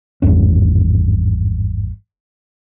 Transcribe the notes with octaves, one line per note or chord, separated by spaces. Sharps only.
G#1 E2 G2 C#4